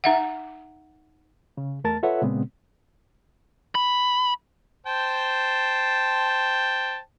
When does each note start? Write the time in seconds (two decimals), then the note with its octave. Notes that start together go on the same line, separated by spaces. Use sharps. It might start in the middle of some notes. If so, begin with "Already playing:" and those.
0.04 D#4 E5 F#5
1.57 C#3
1.84 E2 A3 A#4 A5 A6
2.03 F4 A4 B4 C#5 E5 F#5
2.22 A#2 C#3 G#3 B3 C4
3.75 B5
4.86 C5 G5 A5